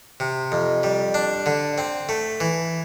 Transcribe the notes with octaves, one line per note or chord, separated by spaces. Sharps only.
C3
F2
G3
D4
D3
C4
A3
E3